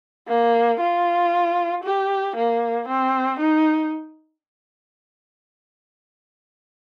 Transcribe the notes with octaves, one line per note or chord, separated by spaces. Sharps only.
A#3
F4
G4
A#3
C4
D#4